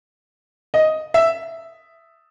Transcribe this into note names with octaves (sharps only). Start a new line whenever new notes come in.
D#5
E5